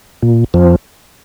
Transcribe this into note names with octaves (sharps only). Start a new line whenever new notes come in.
A#2
F2 F3